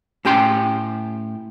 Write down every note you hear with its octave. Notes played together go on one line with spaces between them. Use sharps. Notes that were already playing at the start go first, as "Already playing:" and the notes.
A2 C#4 G4 G5 C6